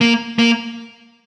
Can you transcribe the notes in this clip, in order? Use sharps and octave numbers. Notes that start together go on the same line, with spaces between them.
A#3
A#3